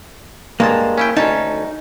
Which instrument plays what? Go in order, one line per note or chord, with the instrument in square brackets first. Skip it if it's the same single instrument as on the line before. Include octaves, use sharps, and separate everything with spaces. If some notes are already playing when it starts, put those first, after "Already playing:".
[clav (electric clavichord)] G2 G#3 A5 [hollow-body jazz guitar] A#3
[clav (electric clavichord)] C#4 E4 G5
[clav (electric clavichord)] D2 C#4 A5 [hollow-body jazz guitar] D#4